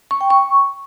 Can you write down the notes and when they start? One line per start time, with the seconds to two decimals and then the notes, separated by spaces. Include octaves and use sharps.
0.11 C#6
0.21 G5
0.30 C#6